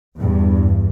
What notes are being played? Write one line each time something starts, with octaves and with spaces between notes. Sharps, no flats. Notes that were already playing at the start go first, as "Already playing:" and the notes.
E2 G2